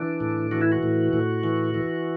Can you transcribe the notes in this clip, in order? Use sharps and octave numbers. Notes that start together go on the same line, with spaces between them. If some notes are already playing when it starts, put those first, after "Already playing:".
Already playing: E3 D4
A2
E3 F#4
E4
F#4
A2
A2
E3
E3